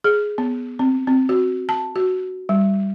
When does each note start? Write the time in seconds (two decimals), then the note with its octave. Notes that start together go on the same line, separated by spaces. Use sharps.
0.04 G#4
0.38 B3
0.79 C4
1.07 C4
1.29 F#4
1.69 A5
1.96 F#4
2.49 G3